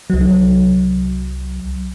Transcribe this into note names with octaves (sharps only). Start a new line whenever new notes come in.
C2 F#3